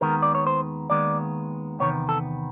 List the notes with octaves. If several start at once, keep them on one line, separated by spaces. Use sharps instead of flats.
D#2 D#3 G#3 B3 A#4
D5
C#5
C5
D#2 D#3 G#3 B3 D5
E2 C3 D#3 B3 C#5
A4